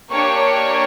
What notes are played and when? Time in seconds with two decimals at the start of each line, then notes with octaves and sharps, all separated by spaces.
0.10 A#3 D4 G4 C#5 C#6